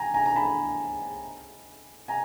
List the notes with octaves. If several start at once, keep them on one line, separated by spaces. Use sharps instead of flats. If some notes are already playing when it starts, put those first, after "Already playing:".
Already playing: G5 G#5 A#5
G#5 A#5
A#5
A5 B5
G#5 A#5